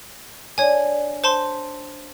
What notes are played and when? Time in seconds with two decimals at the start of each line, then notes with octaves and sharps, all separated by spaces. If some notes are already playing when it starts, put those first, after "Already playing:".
0.58 D4 C#5 G#5
1.24 C5 A5 C6